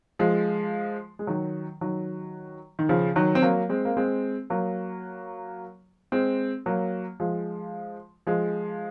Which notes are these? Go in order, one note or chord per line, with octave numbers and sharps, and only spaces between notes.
F3 G#3
G#3
D#3 F#3
D#3 F#3
D#3
C#3 F3
D#3 F#3
C4
F#3 A#3
G#3 C4
A#3
G#3 C4
F#3 A#3
G#3 C4
F#3 A#3
F3 G#3
F3 G#3